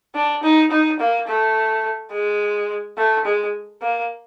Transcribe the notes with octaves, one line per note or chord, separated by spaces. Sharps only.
D4
D#4
D#4
A#3
A3
G#3
A3
G#3
A#3